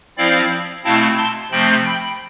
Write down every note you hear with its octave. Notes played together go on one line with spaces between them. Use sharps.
F3 C4 E4 D5 F5
B2 A3 C4 E4 F5 A5
A5 C6
C3 F3 A3 C4 G5 B5
G5 B5